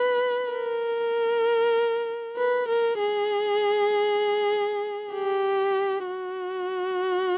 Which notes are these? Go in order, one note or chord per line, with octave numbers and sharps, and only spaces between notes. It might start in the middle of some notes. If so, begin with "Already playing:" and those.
Already playing: B4
A#4
B4
A#4
G#4
G4
F#4